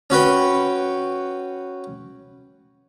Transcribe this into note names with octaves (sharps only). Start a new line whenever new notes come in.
C#4 F#4 B4 G5